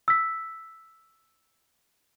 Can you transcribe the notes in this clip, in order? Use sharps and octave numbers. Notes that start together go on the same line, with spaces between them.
E6 B6